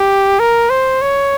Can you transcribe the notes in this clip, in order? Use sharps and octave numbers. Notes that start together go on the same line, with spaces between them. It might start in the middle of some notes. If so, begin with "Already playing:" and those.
Already playing: G4
A#4
C5
C#5